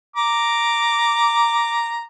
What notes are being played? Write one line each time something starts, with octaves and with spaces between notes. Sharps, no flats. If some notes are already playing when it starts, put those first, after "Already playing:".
A#5 D6